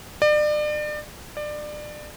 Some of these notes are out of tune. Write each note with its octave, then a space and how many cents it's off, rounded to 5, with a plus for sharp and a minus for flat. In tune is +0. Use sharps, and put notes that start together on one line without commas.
D5 +35
D5 +25